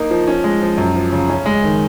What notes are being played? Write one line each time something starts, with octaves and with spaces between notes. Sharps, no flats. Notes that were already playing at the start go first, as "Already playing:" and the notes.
Already playing: A#3 D#4
F3
C#4
G#3
F3
F#2
F3
C#3
C#4
G#3
D#3